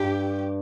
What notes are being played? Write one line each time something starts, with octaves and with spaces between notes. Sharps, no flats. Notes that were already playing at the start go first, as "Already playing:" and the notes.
Already playing: G2 G4